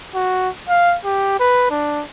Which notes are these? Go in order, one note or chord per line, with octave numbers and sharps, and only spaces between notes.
F#4
F5
G4
B4
D4